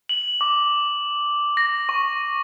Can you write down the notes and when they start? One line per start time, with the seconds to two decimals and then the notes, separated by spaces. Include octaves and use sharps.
0.09 F#7
0.41 D6
1.57 A#6
1.89 C#6